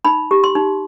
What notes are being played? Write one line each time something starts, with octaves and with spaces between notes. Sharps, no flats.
D#4 B5
G4
C6
D#4